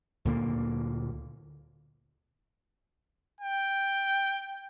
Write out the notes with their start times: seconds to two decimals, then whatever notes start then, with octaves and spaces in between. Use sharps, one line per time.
0.25 D2 A#2 D3 A#3
3.41 G5